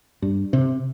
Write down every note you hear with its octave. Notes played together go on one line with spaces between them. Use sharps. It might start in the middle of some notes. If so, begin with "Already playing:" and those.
G2
C3